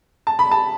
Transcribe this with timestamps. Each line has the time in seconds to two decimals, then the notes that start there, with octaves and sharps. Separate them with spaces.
0.27 A5
0.39 B5
0.51 A5